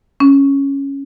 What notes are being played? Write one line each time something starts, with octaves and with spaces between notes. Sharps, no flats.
C#4